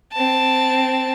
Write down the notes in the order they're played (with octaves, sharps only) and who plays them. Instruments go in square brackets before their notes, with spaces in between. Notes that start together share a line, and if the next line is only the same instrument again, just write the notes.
[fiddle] C4 A5